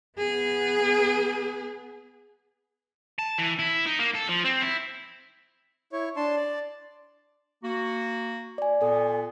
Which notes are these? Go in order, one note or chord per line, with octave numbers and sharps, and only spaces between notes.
B3 G#4
A5
E3
E4
D#4
A#3
A4
F3
C4
E4
E4 C#5
D4 A5 C6
D5
A#3 F#4
D5 G#5
A#2 B3 A4 G#5